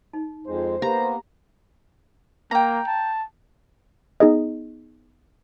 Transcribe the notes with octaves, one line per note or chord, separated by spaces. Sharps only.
D#4
F2 G#3 C5
A#3 B3 G4 A#5
A#3 G5 A#5
A5
B3 D#4 G#4 D#5